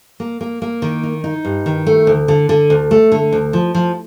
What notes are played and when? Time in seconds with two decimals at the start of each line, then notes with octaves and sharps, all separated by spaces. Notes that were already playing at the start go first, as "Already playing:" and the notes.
0.20 A#3
0.41 A#3
0.62 A#3
0.82 D#3
1.03 D#4
1.24 D#4
1.45 G2
1.66 D#3
1.87 A3
2.07 D2
2.28 D3
2.49 D3
2.70 D2
2.91 A3
3.12 D3
3.32 D2
3.53 F3
3.75 F3